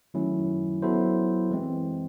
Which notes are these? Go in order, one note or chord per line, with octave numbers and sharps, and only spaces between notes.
D#3 F#3 A3 C#4 E4
F#3 B3 E4 A4 C5
E3 G#3 C4